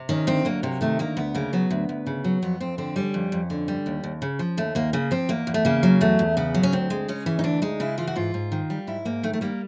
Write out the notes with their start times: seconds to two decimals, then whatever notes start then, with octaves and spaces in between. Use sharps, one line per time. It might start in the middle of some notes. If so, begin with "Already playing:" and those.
Already playing: C3
0.09 D#3 C#4
0.27 D2 C4
0.45 F#3 A#3
0.63 C3 A#3
0.81 D#3 A3
0.99 D2 A#3
1.17 D2 B3
1.35 C#3 A#3
1.53 F#3 B3
1.71 D2
1.89 D2
2.07 C#3
2.24 F#3
2.42 F2 B3
2.60 F2 C4
2.78 D3 C4
2.96 G3 C#4
3.14 F2
3.32 F2
3.50 D3
3.68 G3
3.86 D#2
4.04 D#2
4.22 C#3
4.39 F3
4.57 D#2 A3
4.75 D#2 A#3
4.93 C#3 A#3
5.11 F3 C4
5.29 E2 A#3
5.47 E2
5.54 A3
5.65 C#3 A#3
5.83 F#3
6.01 E2 A3
6.19 E2
6.37 C#3 B3
6.55 F#3
6.63 C#4
6.72 D2 C4
6.90 G#3
7.08 C#3 C#4
7.26 E3
7.39 D#4
7.44 D2 D4
7.62 G#3 D#4
7.80 C#3 E4
7.98 E3 F4
8.07 F#4
8.16 G#2 F4
8.34 G#2
8.52 D#3
8.70 G3
8.87 G#2 E4
9.05 G#2 A#3
9.23 D#3 A3
9.33 A3
9.41 G3 A#3